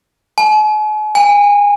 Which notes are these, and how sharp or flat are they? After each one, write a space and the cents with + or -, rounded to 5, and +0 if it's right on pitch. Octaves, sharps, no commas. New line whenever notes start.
G#5 +45
G#5 -25